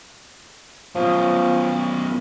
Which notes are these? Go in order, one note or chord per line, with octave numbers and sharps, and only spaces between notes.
F#2 B2 F3